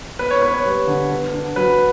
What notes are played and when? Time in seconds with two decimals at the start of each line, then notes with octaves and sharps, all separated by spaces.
0.19 B3 B4
0.31 C#5
0.42 B3 B4
0.54 C#5
0.65 G3
0.87 D3
1.11 B3
1.33 D4
1.56 F#3 B4